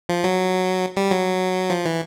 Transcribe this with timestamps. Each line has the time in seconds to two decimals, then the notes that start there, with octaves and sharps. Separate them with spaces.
0.09 F3
0.24 F#3
0.97 G3
1.11 F#3
1.70 F3
1.85 E3